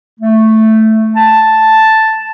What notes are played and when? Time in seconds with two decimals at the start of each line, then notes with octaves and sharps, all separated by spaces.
0.19 A3
1.16 A5